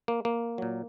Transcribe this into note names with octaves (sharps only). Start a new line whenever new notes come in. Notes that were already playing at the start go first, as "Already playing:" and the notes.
A#3
A#3
A#2 F#3